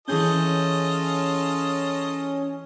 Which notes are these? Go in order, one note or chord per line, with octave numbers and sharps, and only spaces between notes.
E3 C#4 F4 G#4 A4 D#5 G6